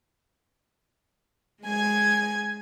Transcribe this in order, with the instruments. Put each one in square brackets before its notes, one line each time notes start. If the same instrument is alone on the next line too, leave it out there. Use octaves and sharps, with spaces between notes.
[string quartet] G#3 G#5 G#6